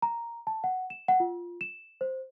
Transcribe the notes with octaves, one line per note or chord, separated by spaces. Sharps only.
A#5
A5
F#5
E7
F#5
F4
E7
C5